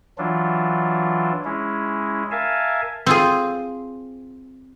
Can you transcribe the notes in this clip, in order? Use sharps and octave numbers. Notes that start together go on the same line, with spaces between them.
E3 F#3 D4 F4
G#3 C#4 E4
A#4 E5 F5 G#5 A5
C4 F4 G#4